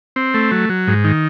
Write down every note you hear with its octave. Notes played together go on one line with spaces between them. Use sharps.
C4
A3
F#3
F#3
G#2
D#3